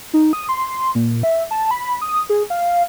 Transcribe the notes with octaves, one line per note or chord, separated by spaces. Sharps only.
D#4
D#6
C6
A#2
E5
A5
B5
D#6
G#4
F5